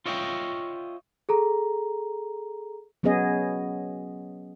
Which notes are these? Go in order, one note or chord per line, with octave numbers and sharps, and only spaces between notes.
F4 C#5 D#5 E5 G5
G#4 A4 A#5
F#3 B3 C#4 G#4 D#5